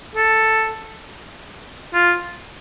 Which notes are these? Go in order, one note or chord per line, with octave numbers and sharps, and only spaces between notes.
A4
F4